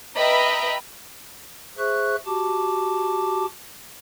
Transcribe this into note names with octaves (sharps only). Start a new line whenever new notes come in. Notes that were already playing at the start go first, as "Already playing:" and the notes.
B4 D#5 E5 G5 A#5 B5
G#4 C5 E5 C#6 F#6
F#4 G4 A5 D6